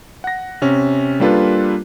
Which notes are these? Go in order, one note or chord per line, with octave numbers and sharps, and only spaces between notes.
F#5 A#6
C3 C#4
G3 A#3 D4 F4 A4 B4